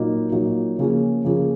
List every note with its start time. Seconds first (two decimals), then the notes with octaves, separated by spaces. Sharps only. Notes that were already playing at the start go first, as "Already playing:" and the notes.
Already playing: A#2 F#3 A#3 D#4
0.32 A#2 F#3 A#3 D#4
0.78 C#3 F3 A#3 C#4 G#4
1.24 C#3 F3 A#3 C#4 G#4